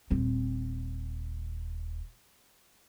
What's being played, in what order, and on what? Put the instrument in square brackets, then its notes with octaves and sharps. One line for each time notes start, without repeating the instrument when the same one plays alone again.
[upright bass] D#1 C4